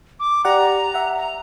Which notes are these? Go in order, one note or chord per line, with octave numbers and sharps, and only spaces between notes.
D6
G4 D5 F#5 A#5
E5 F#5
A#5